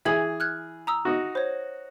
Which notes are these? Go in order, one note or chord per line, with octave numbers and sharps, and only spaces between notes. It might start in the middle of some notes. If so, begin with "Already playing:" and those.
E3 G#4 E5 G#6 F#7
F6 F#6 G#6
A#5 D#6 E6
D#4 F#4
C5 C#5